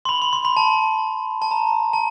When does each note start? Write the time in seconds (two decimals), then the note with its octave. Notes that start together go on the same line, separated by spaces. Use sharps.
0.05 C6
0.09 B5
0.22 C6
0.33 C6
0.45 B5
0.57 A5
1.42 A5
1.51 A#5
1.93 A5